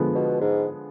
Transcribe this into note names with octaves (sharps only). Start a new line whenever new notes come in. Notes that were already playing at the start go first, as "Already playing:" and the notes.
Already playing: D3 F3 G#3 B3
B2
G#2